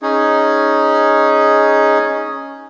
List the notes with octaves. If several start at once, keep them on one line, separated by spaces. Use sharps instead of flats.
C#4 D#4 G#4